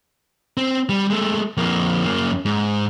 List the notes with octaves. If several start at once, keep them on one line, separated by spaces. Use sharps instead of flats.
C4
G3
G#3 A3
F2 A#3
F#2 A#3
G#2